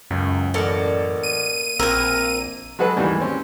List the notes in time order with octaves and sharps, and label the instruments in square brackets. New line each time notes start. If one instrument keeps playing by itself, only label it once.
[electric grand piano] C#2 [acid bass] F#2
[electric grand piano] A1 A4 C#7 [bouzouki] A#3 D5
[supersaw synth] D#7
[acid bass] A#1 [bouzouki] A#3 A#4 [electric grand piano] C4 A#5 E6
[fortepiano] F#3 G#3 F#4 G#4 A4 B4
D#2 G#2 E3 G3
C4 C#4